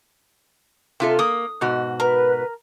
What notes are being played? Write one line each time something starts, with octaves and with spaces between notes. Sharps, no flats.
C3 F4 A4 E5
A#3 D#6
G#2 B2 F#4
A#4 B4